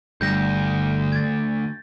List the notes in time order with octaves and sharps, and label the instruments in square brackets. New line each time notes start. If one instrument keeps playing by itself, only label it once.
[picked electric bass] G1 D3 G3 [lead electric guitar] D2 [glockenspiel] G6 A#6
[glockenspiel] G#6 A6